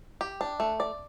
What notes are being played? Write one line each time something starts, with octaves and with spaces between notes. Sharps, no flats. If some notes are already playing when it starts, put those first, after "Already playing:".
G4
D4
A3
D5